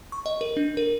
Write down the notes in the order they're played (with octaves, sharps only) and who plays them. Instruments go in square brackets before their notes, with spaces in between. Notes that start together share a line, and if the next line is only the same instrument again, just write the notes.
[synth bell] C#6
D#5
A#4
D4
A#4